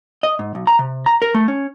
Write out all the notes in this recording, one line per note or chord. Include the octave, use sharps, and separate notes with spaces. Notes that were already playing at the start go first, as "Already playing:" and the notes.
D#5
G#2
B1
A#5
C3
A#5
A#4
A3
C#4